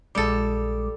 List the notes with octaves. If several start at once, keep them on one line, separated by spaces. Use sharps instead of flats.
A#1 G3 G#3 A4 D6